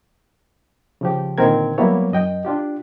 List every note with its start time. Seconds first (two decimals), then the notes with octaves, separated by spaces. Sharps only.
1.01 C#3 F3 G4
1.38 A#2 D3 D#3 C4 A#4 G#6
1.78 F#3 G3 A#3 B3 E4 C#5
2.12 F#2 D#5 G5
2.45 D4 F4 G4